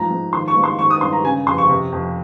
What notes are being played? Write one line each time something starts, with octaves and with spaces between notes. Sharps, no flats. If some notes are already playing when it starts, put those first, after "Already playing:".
Already playing: G#2 F3 A#5
G#2
D#3 C6
C#6
G#2
C6
D#3 C#6
D#6
G2 C6
A#5
C#3 G#5
F2 C6
C#6
C3
F2